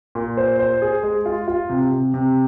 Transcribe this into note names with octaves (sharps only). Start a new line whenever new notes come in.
A#2
C5
C5
G#4
G#3
F4
F4
C3
C3
C3